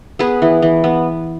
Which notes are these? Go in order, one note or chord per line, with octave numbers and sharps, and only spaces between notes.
B3 G#4 B4
E3
E3
B3